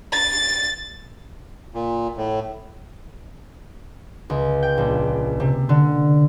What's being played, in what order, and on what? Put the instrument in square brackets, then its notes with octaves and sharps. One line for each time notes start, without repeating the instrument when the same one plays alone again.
[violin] A6
[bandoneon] A#2
A2
[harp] C#2
G5
A#1
C3
D3